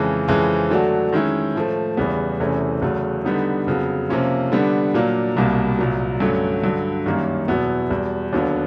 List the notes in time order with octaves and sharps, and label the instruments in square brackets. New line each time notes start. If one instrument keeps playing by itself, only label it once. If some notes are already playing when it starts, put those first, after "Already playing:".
Already playing: [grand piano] F2 C#3 E3 G#3
F2 C#3 E3 G#3 C4
D3 F#3 A3 D4 F#4
D#3 G#3 C#4 E4
A2 F3 A3
E2 C#3 E3 G3 B3
E2 C3 E3 A3 C#4
E2 C#3 F#3 A3
D3 G3 B3 D#4
F2 C#3 F#3 B3
C3 F3 A#3 C#4 F4
D3 G3 B3 D4
A#2 F#3 A#3 D4
C2 B2 G3 A#3
C2 A#2 F#3
G2 D3 F#3 A3 C#4
G2 D3 F#3
F#2 D#3 G3 A#3 C#4
E2 B2 F#3 B3 E4
E2 B2 G3
D#2 D3 F#3 B3 D4